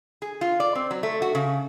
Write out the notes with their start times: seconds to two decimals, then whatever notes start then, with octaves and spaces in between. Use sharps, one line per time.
0.22 G#4
0.41 F4
0.60 D5
0.75 C4
0.91 F#3
1.03 A3
1.22 F#4
1.35 C#3